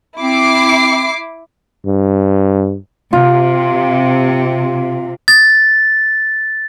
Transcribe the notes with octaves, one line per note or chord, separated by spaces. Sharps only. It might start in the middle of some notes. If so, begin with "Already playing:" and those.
C4 E4 D6 C7
G2
C3 F4
A6